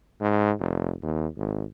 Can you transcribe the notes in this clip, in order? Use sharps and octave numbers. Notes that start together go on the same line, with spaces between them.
G#2
F1
D#2
G#1